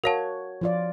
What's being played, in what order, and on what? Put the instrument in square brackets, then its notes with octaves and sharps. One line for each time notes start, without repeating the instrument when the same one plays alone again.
[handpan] F#4 C#5 [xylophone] A#4 F5 A5
[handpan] F3 F4 D5